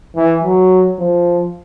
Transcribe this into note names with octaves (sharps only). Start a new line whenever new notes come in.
E3
F#3
F3